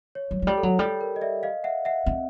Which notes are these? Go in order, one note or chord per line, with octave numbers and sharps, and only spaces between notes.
C#5
F#3
F#3
G3
A4
F#3
G3 A4
A#4
D#5
D5 E5
D#5 F5
E5 F#5
E5 F#5
C4